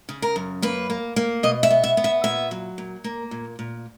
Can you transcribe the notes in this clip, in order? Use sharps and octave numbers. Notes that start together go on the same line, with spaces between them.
C#3
A#4
F#2
A#3 B4
A#3
A#3
B2 D#5
E5
B3
E5
B3
E5
A#2 E5
F#3
A#2
A#3
A#2
A#2